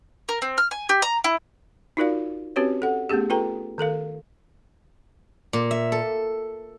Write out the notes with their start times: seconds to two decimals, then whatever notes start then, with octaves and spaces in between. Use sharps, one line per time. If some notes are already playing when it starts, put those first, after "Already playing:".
0.29 A#4
0.42 C4
0.58 F6
0.71 G#5
0.89 G4
1.02 A#5
1.24 E4
1.97 D#4 F4 F#4 A#4 D5 F5
2.56 C4 C#4 F#4 G4 B4 C#5
2.82 A4 F#5
3.09 A3 B3 C#4 G4 G#4
3.30 F4 A4 B4 G5 A#5
3.78 D#3 A4 A#4 F5
5.53 A#2
5.71 E5
5.92 A4